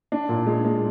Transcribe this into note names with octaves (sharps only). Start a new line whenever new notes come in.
D4
A#2
G#3
G#3